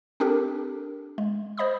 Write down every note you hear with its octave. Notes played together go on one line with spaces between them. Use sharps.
C4 D4 G4 A4 A#4
G#3
C5 D#5 B5 D#6